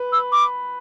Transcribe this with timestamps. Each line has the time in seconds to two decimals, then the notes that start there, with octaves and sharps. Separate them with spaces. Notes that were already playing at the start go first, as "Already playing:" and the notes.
Already playing: B4
0.12 E6
0.32 D6